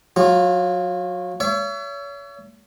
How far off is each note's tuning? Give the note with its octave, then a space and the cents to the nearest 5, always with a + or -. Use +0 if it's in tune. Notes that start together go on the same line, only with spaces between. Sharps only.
F#3 -25 F4 +5
C#5 +35 E5 +40